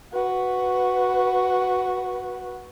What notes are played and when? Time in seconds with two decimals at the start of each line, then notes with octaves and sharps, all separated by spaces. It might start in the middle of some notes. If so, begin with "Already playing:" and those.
0.13 F#4 B4